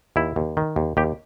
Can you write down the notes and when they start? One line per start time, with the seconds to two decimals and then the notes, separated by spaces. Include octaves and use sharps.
0.16 D#2 E4
0.36 D#2
0.57 D#3
0.76 D#2
0.97 D#2 G4